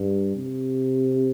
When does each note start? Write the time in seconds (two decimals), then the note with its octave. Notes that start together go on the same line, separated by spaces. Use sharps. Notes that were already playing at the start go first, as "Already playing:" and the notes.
Already playing: G2
0.36 C3